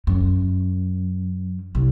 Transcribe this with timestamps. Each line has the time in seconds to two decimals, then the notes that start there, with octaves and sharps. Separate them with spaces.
0.07 F#2
1.75 C2